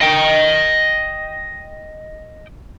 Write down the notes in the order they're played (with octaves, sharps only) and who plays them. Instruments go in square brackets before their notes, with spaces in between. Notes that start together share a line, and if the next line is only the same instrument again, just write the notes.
[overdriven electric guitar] D#5 G5